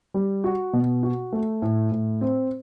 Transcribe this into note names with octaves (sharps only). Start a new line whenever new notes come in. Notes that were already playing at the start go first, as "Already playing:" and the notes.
G3
F#4
B2
F#4
A3
A2
A2
C4